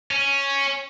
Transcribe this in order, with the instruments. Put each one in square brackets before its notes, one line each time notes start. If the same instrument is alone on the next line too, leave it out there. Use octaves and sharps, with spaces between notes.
[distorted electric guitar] C#4